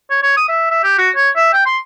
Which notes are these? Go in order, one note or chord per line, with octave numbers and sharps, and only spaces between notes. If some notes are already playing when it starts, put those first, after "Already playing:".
C#5
C#5
D#6
E5
E5
G4
F#4
C#5
E5
G5
C6